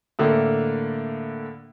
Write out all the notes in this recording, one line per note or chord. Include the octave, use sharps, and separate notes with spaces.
A2 D3 A#3